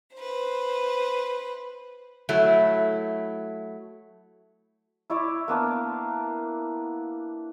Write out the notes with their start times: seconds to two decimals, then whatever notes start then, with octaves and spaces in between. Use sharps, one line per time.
0.17 B4 C5
2.29 F#3 A3 E4
5.10 E4 C#5 D5 E5
5.48 A#3 B3 D4